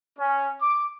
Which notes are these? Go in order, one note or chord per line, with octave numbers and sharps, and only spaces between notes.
C#4
D6